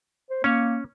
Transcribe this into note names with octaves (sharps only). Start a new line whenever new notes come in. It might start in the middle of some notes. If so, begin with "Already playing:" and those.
C5
A#3 C#4 C#5